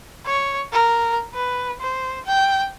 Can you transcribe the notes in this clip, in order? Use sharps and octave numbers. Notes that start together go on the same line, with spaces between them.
C#5
A#4
B4
C5
G5